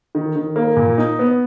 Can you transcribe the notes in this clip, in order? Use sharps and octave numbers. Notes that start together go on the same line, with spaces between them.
D#3
D#3
A#3
A#2
D#4
B3